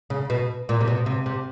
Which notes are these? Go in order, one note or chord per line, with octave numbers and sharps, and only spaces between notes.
C#3
B2
A#2
C3
B2
C3
C3